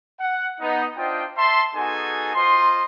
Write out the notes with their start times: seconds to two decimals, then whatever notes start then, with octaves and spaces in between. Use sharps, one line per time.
0.19 F#5
0.60 B3 D#4
0.96 D4 F4 C5 D#5 G5
1.37 E5 A5 C6
1.74 B3 D#4 F#4 G#4 A4 G#5
2.34 F4 C5 D#5 C6